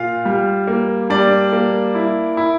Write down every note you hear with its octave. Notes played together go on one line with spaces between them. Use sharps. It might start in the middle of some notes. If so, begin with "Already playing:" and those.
Already playing: A#2 F4 F5
G3
A#3
G3 D4 D5
A#3
E4
E4